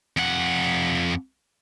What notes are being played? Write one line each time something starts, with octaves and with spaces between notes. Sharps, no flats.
F2 F#5